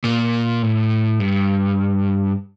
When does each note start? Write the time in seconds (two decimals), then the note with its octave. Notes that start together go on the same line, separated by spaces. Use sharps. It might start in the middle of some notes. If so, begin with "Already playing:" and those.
0.04 A#2
0.63 A2
1.20 G2